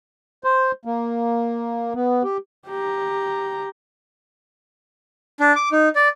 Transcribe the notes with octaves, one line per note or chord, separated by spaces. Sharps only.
C5
A#3
B3
G4
G4 A#5
D4
D6
D#4
D5